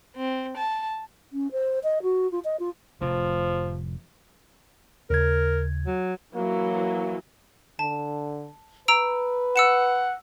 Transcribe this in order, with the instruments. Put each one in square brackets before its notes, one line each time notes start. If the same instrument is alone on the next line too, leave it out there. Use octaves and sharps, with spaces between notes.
[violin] C4
A5
[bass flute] C#4
C5
D#5
F#4
F4
D#5
F4
[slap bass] F1 A2 C3 [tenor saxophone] F3
[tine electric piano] D#2 C#3 G#6 [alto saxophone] A#4
[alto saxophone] F#3
[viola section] E3 F#3 [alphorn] A#3
[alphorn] D3 [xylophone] A5
[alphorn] B4 [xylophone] A#5 E6 D7
[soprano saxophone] F#5 [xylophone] E6 C#7 E7